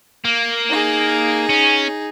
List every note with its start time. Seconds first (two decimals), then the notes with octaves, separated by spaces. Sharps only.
0.25 A#3
0.69 D#4 G#4
1.49 C#4